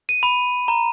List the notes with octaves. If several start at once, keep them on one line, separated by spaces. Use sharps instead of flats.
D#7
B5
A#5